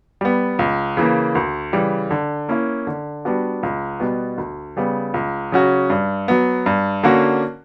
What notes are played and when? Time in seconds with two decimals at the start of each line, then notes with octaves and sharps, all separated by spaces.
0.21 G3 B3
0.59 C#2
0.97 C#3 E3 A#3
1.35 D2
1.73 C#3 E3 G3
2.11 D3
2.49 A#3 C#4 E4
2.87 D3
3.25 G3 B3 D4 F#4
3.63 C#2
4.00 B2 G3 B3
4.38 D2
4.77 C#3 G3 B3
5.14 C#2
5.52 C#3 F#3 C#4 F#4
5.90 G2
6.28 F#3 B3
6.66 G2
7.03 D3 A#3 C#4 F#4